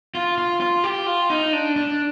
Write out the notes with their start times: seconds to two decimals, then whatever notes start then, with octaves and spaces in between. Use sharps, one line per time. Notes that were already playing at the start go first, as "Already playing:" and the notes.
0.15 F4
0.38 F4
0.60 F4
0.84 G4
1.06 F4
1.30 D#4
1.53 D4
1.76 D4